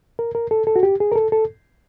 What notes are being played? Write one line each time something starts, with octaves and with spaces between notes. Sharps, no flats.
A#4
A#4
A4
A4
F#4
G4
G#4
A#4
A4
A4